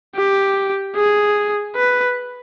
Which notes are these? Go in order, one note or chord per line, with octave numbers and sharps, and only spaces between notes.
G4
G#4
B4